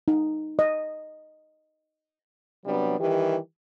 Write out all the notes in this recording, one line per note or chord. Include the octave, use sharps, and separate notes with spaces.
D#4
D#5
C3 F#3 G3 B3 D4
D#3 E3 G3 G4